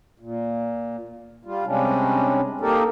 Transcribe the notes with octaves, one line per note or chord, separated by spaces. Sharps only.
A#2
G3 F4
C3 G3 G#3 C#4 D4
A#3 D#4 G4 A4 A#4